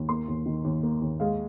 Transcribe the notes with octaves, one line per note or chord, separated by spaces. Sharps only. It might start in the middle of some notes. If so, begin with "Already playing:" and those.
Already playing: D#2
A#3 C6
D#2
D#3
D#2
A#3
D#2
G#3 F5